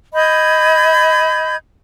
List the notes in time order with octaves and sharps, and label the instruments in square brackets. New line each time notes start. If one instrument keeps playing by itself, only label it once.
[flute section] D#5 B5 G6 G#6